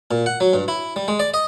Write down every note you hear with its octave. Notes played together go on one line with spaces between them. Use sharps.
A#2
F#5
F#3
G2
E4
G3
G#3
D5
D#5